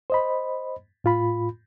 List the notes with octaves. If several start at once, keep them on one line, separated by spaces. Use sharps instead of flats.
C5 D#5 B5
A2 F4 B5